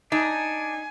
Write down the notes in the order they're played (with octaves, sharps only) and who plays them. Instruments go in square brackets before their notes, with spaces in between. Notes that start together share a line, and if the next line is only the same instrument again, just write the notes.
[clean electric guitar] D4 [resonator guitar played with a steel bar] D#4 [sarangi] G#5